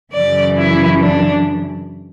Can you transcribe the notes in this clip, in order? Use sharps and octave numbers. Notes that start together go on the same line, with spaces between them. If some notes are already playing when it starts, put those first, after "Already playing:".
F#2 C#3 E3 D5
E4
D4